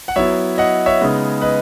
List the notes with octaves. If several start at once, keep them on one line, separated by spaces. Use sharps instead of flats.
F#5
F#3 B3 E4 C#5 E5
D#5 F#5
C#5 E5
C#3 G#3 B3 D#4
B4 D#5